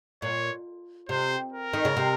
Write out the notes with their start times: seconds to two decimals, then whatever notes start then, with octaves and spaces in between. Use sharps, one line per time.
0.22 A#2 C#5
1.09 C3 C5
1.53 A#4
1.73 D#3
1.85 C#3
1.97 C3